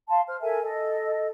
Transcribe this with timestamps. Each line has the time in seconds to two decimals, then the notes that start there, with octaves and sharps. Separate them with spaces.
0.09 F5 A5 C6
0.27 C5 F6
0.41 A4 A#4 E5 G#5
0.62 A4 D#5